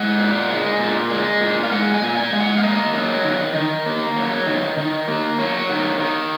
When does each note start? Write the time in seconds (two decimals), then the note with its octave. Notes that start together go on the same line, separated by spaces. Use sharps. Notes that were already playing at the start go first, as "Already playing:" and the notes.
Already playing: G#3 F#5
0.18 A#2
0.49 G#3
0.79 A#2
1.10 G#3
1.41 A#2
1.63 F5
1.71 G#3 F#5
1.94 G#5
2.02 A#2
2.17 G#5
2.33 G#3
2.40 F#5
2.57 F5
2.63 A#3 D#5
2.94 F#3
3.25 D#3
3.55 D#3
3.86 A#3
4.16 F#3
4.46 D#3
4.78 D#3
5.08 A#3
5.39 F#3 C#5
5.69 D#3
6.00 D#3